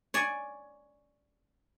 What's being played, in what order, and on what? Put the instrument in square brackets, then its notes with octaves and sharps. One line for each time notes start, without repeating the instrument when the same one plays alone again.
[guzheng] C#5 D5 G#5